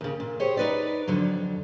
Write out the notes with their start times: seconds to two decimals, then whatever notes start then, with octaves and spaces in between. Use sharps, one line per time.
0.01 D#2 C#3
0.20 A#2
0.40 G4 G#4 C5 C#5
0.57 D#4 B4 D5
1.07 F2 D3 F#3